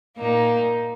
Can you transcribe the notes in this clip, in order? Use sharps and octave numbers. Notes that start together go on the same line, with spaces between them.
A#2 A#3 D#4